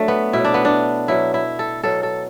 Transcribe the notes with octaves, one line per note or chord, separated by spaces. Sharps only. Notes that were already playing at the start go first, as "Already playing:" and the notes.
Already playing: F#3 A3 D4
B3
B2 E4
F#3
D4
B3
D4
B2 F#3 E4
E4
A4
B2 F#3 A4
A4